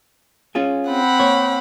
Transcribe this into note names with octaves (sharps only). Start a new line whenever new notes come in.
C#4 F4 G#4
C4 F#5 B5
A#3 C#5